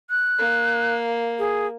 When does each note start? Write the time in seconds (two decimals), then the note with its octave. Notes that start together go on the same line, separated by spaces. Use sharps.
0.10 F#6
0.39 A#3
1.39 G#4